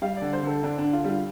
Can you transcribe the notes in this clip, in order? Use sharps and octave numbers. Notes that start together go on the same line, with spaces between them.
G3 F5
D3 D5
C5
D3 A4
D3 D4
D4
D3
F4
G3
F4